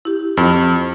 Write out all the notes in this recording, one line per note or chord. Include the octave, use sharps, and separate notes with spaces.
E4 G4
F2